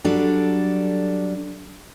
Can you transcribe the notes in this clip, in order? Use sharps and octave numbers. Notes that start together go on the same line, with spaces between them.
F#3 G3 D4 A4